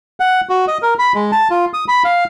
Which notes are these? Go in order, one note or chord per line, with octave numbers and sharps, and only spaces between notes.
F#5
F#4
D#5
A#4
B5
G#3
A5
F4
D#6
B5
F5